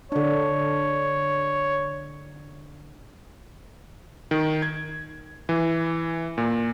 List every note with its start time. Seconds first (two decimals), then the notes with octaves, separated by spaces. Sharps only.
0.12 D3 D4 C#5
4.31 D#3
4.62 G#6
5.49 E3
6.38 A#2